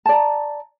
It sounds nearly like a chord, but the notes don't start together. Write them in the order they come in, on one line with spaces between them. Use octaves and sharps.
A5 D5 A#5